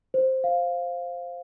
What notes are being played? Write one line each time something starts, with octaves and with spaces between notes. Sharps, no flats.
C5
F5